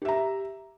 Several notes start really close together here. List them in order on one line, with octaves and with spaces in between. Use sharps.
G4 E5 A#5